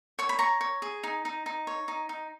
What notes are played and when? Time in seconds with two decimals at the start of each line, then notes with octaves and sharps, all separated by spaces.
0.19 C#5 C#6
0.29 B5
0.39 C#5 A#5 C#6
0.61 C#5
0.82 G#4
1.03 D#4
1.25 D#4
1.46 D#4
1.67 C#5
1.88 D#4
2.09 D#4